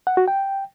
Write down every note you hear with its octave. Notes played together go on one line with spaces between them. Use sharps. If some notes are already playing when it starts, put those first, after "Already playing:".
F#5
F#4
G5